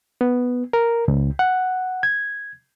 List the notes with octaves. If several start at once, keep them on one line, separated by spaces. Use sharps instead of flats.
B3
A#4
C#2
F#5
G#6